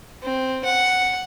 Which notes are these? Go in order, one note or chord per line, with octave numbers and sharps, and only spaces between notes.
C4
F#5